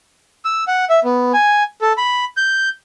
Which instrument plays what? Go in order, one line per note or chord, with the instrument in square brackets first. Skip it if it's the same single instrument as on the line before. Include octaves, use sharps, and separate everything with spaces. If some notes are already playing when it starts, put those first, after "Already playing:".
[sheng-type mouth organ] E6
F#5
E5
B3
G#5
A4
B5
G6